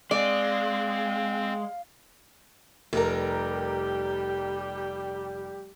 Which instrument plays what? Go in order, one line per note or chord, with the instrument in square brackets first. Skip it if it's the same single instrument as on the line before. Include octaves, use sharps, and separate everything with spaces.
[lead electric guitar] G#3 [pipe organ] C4 [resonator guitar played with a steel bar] D5 [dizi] F5
[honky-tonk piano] F1 A#4 [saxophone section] G3 G4